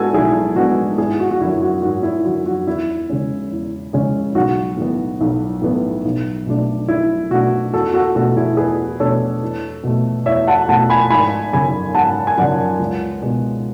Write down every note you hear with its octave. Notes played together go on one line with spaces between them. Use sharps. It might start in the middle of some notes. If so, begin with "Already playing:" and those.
Already playing: A2 G#3 B3 D4 F#4 A4 G#5
B1 E4 G#4
A2 G#3 B3 D4 F#4
G#1 E4 G#4
F#4
F#4
F#2 D3 E4
F#4
G#1 F#4
E4
F#2 D3 F#4
F#4
E2 E4
C#3 G#3 C#4
E2
C#3 G#3 C#4
B1 F#4
A2 E3 B3
B1
A2 E3 B3
B1
B2 A3 D4
B1 E4
B2 A3 D4 F#4
E2 F#4 A4
F#4 A4
B2 A3 D4 F#4 A4
E4 G#4
E2 G#4 B4
B2 A3 D4 A4 C#5
E2
B2 A3
E2 C#5 E5
F#5 A5
B2 A3 F#5 A5
G#5 B5
G#1 G#5 B5
F#2 C#3 G#5 B5
G#1 F#5 A5
G#5
F#2 C#3 D5 F#5
C#2
B2 G#3 B3